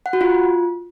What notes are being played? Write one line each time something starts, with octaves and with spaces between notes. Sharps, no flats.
F#5
F#4
F4